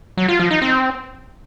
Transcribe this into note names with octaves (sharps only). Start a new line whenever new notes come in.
F#3
F4
F3
D#4
C4